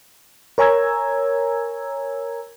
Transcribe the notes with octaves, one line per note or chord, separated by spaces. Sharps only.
A#4 C#5 G#5 A#5 E6 G#6